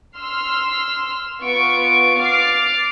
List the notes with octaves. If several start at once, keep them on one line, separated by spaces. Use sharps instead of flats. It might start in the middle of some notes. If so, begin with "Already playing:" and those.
C6 E6 F6
B3 F4 C#6 D7
D6 F6 A6 C7